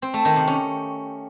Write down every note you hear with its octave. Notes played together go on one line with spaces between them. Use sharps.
C4
A3
D#3
C3
C#4